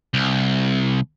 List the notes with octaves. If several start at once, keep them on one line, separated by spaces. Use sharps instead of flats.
C2